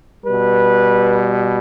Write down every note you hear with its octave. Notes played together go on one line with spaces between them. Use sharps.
B2 G3 B4